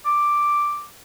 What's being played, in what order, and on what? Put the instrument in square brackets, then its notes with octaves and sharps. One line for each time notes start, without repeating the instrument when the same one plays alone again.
[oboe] D6